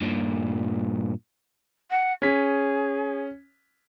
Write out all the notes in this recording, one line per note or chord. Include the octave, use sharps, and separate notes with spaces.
G2 A#2
F#5
C#4 G#4 B6